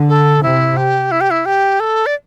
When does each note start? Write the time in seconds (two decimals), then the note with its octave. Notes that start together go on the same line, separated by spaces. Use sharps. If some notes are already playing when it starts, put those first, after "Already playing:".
Already playing: D3
0.09 A4
0.43 C3 E4
0.77 G4
1.11 E4
1.21 G4
1.31 E4
1.46 G4
1.80 A4
2.06 D5